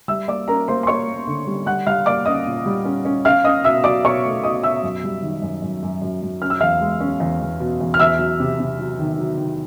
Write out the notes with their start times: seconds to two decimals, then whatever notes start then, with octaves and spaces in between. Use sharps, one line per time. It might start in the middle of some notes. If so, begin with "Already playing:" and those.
0.08 G3 E5 E6
0.28 A#3 D5 D6
0.48 C#4 A#4 A#5
0.68 A#3 C5 C6
0.83 C6
0.87 A#3 C#5 C#6
1.07 A#3
1.27 D3
1.47 G3
1.66 G3 F#5 F#6
1.87 G3 F5 F6
2.06 A#3 D5 D6
2.26 C#4 D#5 D#6
2.45 A#2
2.66 G3
2.85 C#4
3.05 C#4
3.25 C#4 F5 F6
3.44 C#4 D#5 D#6
3.64 B2 E5 E6
3.84 F#3 D5 D6
4.05 B2 C#5 C#6
4.24 A3
4.43 B2 D#5 D#6
4.64 B2 E5 E6
4.83 F#2
5.04 G3
5.22 D#3
5.42 F#2
5.62 F#2
5.83 F#2
6.02 F#2
6.22 F#2
6.42 C#4 F6
6.50 E6
6.61 E2 F5 F6
6.81 G#3
7.00 C#4
7.20 E2
7.41 E2
7.60 B2
7.81 E2
7.94 F6
7.99 E2 E5 E6
8.19 F#3
8.40 C3
8.60 C3
8.80 F#3
8.99 D#3
9.18 F#3
9.38 D#3